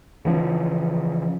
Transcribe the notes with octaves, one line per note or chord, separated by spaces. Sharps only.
C#3 E3 F3 C#4